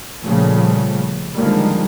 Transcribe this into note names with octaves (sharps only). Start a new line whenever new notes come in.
A#2 C#3 F3 G3 A3
D3 D#3 F3 G3 G#3 A#3